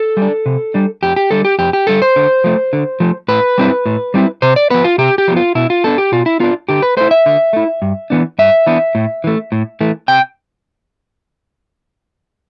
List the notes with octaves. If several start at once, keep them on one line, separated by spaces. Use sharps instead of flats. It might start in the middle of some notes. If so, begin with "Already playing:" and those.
Already playing: A4
G3
D4
C3
G3 D4
F2 G4
G4
D3 G3 A4
G4
F2 G4
G4
D3 G3 A4
C5
D3
F3 A3
D3
F3 A3
A2 B4
G3 C4 E4
A2
G3 C4 E4
C3 C5
D5
F3 B3 B4
F4
C3 G4
G4
F3 B3
F4
B2 E4
F4
B3 D4 A4
G4
B2 F4
E4
B3 D4 F4
D3 G4
B4
A3 E4 C5
E5
D3
A3 E4
G2
E3 B3 D4
G2 E5
E3 B3 D4
A2
E3 A3
A2
E3 A3
C3 G5